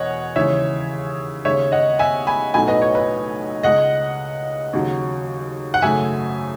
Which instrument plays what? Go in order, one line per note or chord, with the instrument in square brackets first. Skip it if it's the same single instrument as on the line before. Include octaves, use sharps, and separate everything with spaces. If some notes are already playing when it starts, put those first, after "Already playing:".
Already playing: [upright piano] E1 E2 B2 C#5 D#5 F#5
D#2 C#3 E3 G#3 C#5 E5
D#2 C#3 G#3 C#5 E5
D#5 F#5
E5 G#5
G#5 B5
B1 A2 F#3 A3 G#5 B5
B4 D#5
C#5
B4
C#2 C#3 G#3 D#5 F#5
D#2 C#3 F#3
F#5
G#1 F#2 C#3 F#3 A3 E5 G#5